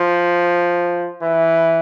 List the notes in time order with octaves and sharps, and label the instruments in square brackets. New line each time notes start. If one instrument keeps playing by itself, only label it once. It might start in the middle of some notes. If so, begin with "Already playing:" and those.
Already playing: [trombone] F3
E3